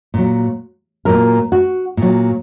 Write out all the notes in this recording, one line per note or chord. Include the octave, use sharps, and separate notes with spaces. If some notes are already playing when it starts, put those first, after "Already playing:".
A#2 F#3
A#2 F#3 A#4
F#4
A#2 F#3